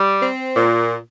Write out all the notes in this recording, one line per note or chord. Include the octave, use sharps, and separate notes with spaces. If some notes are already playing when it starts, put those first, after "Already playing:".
Already playing: G3
C4
A#2